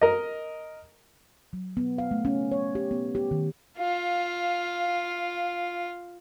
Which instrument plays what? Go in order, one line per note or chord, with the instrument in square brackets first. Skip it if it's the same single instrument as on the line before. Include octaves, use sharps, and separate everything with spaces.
[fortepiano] A#4 D#5
[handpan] F#3
B3
F5
A3
C#4
C#5
G4
B3
G4
D#3
[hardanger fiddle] F4 [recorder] F5